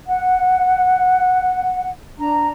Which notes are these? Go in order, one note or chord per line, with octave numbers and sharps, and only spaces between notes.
F#5
D4 A#5